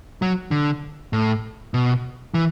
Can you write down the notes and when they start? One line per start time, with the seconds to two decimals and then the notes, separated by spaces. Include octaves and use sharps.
0.22 F#3
0.51 D3
1.13 A2
1.74 B2
2.34 E3